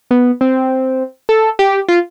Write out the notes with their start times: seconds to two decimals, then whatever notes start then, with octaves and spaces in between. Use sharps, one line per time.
0.11 B3
0.41 C4
1.29 A4
1.59 G4
1.89 F4